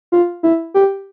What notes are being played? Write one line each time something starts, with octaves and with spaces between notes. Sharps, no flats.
F4
E4
G4